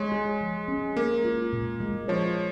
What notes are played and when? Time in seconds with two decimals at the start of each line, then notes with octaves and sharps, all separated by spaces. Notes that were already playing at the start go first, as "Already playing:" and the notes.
Already playing: G#3 C#5
0.12 G#4
0.41 F3
0.68 C#4
0.97 A#3 A#4
1.25 F4
1.53 A#2
1.80 G#3
2.08 F3 C#5